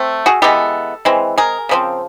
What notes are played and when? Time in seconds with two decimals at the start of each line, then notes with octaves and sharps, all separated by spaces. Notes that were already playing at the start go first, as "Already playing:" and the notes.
Already playing: A3 C4
0.26 F#4 G#4
0.42 E3 G#3 B3 G4 A4
1.05 E3 G#3 C4
1.38 G#4 A#4
1.69 C#3 F3 G#3 C4